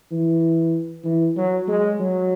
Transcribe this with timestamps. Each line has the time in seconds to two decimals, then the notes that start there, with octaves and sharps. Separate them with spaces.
0.12 E3
1.04 E3
1.37 F#3
1.68 G#3
2.00 F#3